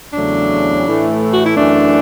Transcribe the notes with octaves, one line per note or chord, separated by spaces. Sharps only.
E2 C#3 F#3 A3 D4
A2 E3 A3
F#4
E4
F#2 E3 A3 D4